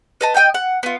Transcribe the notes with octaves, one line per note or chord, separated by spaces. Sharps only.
B4 D#5 A5
D#5 G5 A#5 G6
F#5
B3 F4